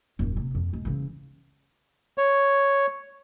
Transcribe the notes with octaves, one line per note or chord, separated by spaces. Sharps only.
D#1 F#2
C3
F2
B2 G#3
C#3 E3
C#5